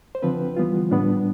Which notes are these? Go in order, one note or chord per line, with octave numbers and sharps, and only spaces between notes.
C5
D3 F3 C4 B4
E3 G3 B3 F4
A2 G3 B3 D4